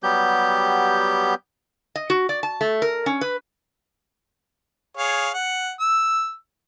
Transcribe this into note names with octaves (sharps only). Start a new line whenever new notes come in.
F#3 G3 B3 G4 G6
D#5
F#4
D5
A5
A3
A#4
C#4
B4
G#4 C#5 F5
F#5
E6